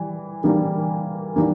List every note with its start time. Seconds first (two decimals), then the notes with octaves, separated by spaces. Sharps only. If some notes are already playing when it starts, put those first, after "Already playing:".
Already playing: E3 G3
0.44 E3 G3 A#3
1.36 E3 G3 A#3